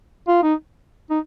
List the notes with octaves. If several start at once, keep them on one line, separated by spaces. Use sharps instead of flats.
F4
D#4
D#4